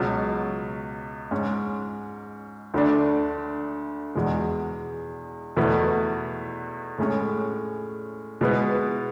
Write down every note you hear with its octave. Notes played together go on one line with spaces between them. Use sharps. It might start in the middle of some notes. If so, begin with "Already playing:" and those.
Already playing: C#2 B2 F#3
G#2 G#3 C#4
D2 D3 A3 D4
E2 B2 G#3
E2 B2 A3 E4 B4
A2 G#3 C#4
B2 G#3 B3 E4 B4